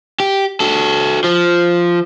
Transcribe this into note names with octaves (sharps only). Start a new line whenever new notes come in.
G4
F#4 A4
F3